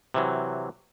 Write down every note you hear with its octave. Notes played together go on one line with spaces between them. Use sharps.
C3 E3 F#3